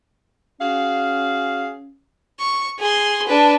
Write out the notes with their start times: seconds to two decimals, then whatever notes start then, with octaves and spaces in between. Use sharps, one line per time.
0.60 C#4 F#4 G#4 F5
2.40 C#6
2.79 G#4 C6
3.27 D4 B4